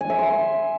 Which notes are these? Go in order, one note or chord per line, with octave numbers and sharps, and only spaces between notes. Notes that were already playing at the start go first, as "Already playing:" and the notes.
G#5
E5
C6